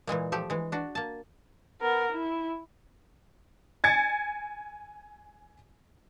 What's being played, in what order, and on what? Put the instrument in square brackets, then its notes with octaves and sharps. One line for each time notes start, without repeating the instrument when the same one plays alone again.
[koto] A#2 E3 G#3 A#3
F3 A3 G4
E3 G#3
D4 F#4
A#3 A5
[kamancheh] B3 A#4
E4
[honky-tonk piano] G#5 G#6 A6 C#7